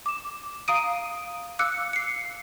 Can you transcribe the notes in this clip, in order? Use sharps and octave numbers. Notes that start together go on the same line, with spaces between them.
D6 E7
F5 A#5 D#6 D7 D#7
F5 D6 E6 F#6 C#7
C7 C#7